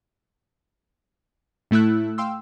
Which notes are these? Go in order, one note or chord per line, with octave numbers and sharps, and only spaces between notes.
A2 A3 E4 E6 F#6
F5 G5 C6 E6